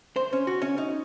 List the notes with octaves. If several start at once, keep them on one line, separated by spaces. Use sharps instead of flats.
C5
C#4
F#4
C#4
D#4